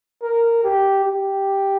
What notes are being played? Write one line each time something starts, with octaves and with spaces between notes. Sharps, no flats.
A#4
G4
G4